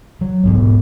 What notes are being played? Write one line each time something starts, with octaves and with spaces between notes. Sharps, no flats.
F#3
E1 G#2 B3